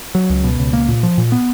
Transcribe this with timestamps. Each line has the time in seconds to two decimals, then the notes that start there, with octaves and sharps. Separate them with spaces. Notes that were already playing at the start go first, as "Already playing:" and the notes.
0.15 F#3
0.30 C#2
0.44 B2
0.59 C#2
0.73 A#3
0.89 A#2
1.03 F3
1.18 A#2
1.32 B3